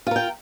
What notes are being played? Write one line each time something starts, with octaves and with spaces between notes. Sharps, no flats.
F4 A#4 G5